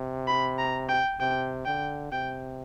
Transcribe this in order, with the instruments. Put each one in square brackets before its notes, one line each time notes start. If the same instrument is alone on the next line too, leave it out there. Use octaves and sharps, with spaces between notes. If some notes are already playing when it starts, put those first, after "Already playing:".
Already playing: [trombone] C3
[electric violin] B5
A#5
G5
[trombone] C3 [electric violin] G5
[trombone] D3 [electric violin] G5
[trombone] C3 [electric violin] G5